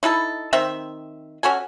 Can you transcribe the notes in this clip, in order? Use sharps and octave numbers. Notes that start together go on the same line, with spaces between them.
D#4 E4 G#4 A4
D#3 C4 E5
C#4 F#4 A4 G#5